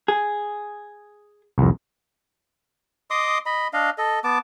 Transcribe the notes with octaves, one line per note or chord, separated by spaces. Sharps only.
G#4
C2 F2
D#5 C6 D6 D#6
D#5 B5
D4 D#5 F5
A4 D#5
B3 A5 D6